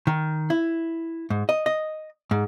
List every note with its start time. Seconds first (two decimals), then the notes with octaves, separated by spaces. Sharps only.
0.07 D#3
0.50 E4
1.30 G#2
1.49 D#5
1.66 D#5
2.31 G#2